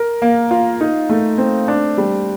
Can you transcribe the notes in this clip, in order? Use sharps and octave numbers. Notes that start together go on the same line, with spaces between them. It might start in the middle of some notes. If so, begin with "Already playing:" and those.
Already playing: A#4
A#3
F4
D#4
A3
C4
D4
G3